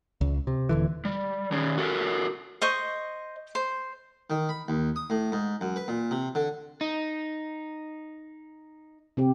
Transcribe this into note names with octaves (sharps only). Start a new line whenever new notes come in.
C#2
C3
D#1 D3 E3
G3
D#3 C#4
F#4 A4 A#4
C5 D#5 C#6
C5
D#3
B5
D#2
D#6
A2
G#2
F#2
B4
A#2
C3
D3
D#4
C3 C4 G4